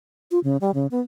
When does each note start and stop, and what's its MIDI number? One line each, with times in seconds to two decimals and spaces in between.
0.31 0.39 65
0.44 0.57 49
0.61 0.71 55
0.74 0.87 49
0.91 1.01 59